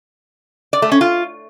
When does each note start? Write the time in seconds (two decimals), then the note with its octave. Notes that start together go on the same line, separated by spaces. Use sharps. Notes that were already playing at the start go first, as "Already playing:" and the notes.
0.73 D5
0.82 A3
0.92 C#4
1.01 F4